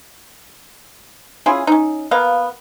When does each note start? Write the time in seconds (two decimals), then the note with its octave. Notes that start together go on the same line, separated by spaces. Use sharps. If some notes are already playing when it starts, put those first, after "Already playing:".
1.46 C#4 E4 F4 G#4
1.67 C#4 D#4
2.11 A#3 B3 F5